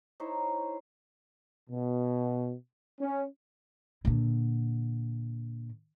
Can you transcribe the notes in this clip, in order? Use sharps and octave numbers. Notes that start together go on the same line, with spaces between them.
D#4 E4 C5 C#5
B2
C#4
A#2 D3